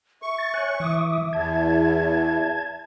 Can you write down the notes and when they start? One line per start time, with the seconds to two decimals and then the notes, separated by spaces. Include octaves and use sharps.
0.22 E5 C#6
0.38 A6
0.54 C#5 G#5 F#6
0.80 E3 D6 D#6
1.33 E2 A5 G#6